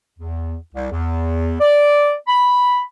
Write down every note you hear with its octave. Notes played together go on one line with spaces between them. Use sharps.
E2
C2
E2
D5
B5